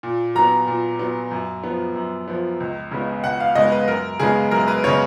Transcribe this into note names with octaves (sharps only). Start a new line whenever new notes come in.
A#2
F#3 B3 A#5
A#2
F#3 B3
F#2
F3 B3
F#2
F3 B3
C#2
C#3 G#3 B3
C#2 F#5
F5
C#3 G#3 B3 D#5
B4
F#2 A#4
C#3 G#3 B3 G#4
F#2 A#4
B4
C#3 G#3 B3 C#5